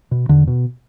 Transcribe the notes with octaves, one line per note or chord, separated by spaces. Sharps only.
B2
E2 D3
B2